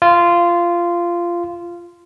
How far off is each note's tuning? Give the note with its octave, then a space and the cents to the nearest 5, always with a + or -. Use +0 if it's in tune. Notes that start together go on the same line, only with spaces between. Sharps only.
F4 -15